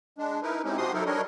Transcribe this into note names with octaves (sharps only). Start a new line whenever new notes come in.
G#3 D4
D#4 E4 A#4 B4
G#3 C4 C#4 D#4 E4 G4
C3 F3 F#4 G4 C6 D#6
F#3 D#4 E4 A4 A#4
G3 D4 A#4 C#5 D#5